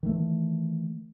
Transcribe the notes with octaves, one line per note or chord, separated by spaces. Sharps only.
D#3 E3 A3